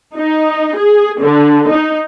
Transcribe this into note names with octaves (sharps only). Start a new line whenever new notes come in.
D#4
G#4
D3
D#4